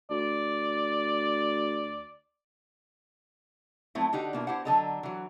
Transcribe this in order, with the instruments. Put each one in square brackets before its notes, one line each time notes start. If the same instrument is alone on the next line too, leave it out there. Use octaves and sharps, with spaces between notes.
[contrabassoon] D2 [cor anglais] D5
[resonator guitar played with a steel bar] F3 F#3 A3 C4 E4
D3 D#4 F#4 G4
B2 A#3 E4
E4 G4 C5 F#5
D3 F#3 A4 D#5 A#5
E3 F#3